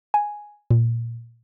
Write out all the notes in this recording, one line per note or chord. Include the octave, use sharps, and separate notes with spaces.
G#5
A#2